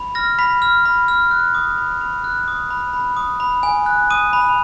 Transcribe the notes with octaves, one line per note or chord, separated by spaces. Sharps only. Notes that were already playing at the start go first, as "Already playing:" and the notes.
Already playing: B5
F6 A#6
B5 B6
F6
B5
F6
F#6
D#6
B5
B5
F#6
D#6
B5
B5
D#6
B5
G#5
F#6
D#6 D#7
B5
F7